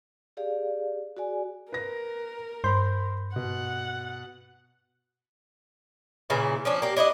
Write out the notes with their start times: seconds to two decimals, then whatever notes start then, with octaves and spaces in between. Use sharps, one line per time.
0.37 G4 G#4 D5 F5
1.17 F#4 G#4 D5 G#5
1.72 A#4 B4 A#6
2.64 G2 C5 B5 C6 G6
3.36 B2 F#5
6.30 A#2 C#3 E3 E4
6.65 F3 C#4 D4
6.82 A#3 G4
6.97 D4 E4 D5 D#5